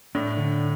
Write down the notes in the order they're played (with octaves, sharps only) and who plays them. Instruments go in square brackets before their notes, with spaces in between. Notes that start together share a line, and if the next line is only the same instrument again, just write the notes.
[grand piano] A2 [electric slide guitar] D4
[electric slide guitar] D3